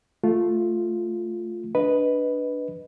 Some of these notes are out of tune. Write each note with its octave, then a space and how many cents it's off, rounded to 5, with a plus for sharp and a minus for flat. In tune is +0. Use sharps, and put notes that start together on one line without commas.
A3 +0 F4 +0
D4 +0 B4 +0 D#5 +0